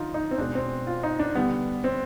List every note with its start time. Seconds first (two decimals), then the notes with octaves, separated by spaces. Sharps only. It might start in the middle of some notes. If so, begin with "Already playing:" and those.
Already playing: D3 F3 D#4 F4
0.14 D#4
0.31 C4
0.38 B2 G#3 D4
0.55 C4
0.87 F4
1.03 D#4
1.19 D4
1.35 D3 G3 B3
1.84 C4